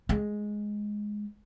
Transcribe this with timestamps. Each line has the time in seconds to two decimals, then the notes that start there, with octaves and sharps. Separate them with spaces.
0.09 G#3